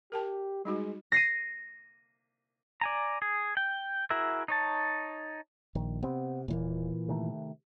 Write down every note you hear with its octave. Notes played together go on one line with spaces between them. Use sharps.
G4 A#4 G5 A5
G3 G#3 D#4 F#4
A#6 C7 D#7
D5 G#5 A#5
G#4
G5
E4 F#4 G#4 A#4 E5
D#4 C#5 A5
A#1 D#3
C3 B3 C4
D#1 A#2 E3 A#3
C3 D#3 A3